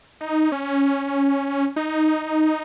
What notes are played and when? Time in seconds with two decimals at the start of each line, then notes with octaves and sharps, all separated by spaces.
0.21 D#4
0.52 C#4
1.76 D#4